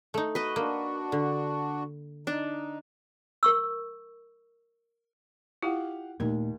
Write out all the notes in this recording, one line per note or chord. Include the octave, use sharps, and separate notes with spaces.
A3 D#4
F#4 B4 D#5
A#3 D4 F#4
D3
D4 D#4
A#4 C#6 E6
E4 F4 G4 F5 F#5
D#2 A#2 A3 D#4 A#4